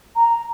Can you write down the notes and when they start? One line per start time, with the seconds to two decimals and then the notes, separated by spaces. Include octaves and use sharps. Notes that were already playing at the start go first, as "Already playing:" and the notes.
0.16 A#5